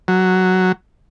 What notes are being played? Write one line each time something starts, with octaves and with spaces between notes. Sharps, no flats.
F#3